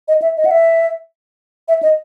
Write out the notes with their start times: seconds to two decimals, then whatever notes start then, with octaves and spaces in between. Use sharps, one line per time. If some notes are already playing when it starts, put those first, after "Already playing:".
0.08 D#5
0.22 E5
0.37 D#5
0.45 F#5
0.51 E5
1.68 E5
1.83 D#5